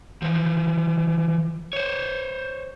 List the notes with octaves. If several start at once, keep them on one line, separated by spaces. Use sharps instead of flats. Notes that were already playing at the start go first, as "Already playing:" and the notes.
E3 F3
C5 C#5